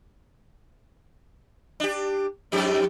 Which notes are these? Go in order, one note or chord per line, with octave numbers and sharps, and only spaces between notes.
D4 G4
F2 G#2 G4